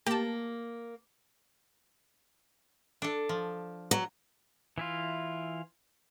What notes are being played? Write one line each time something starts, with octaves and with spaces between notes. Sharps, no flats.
A#3 G4 A5
D4 A4
F3
F#3
E3 E4 F4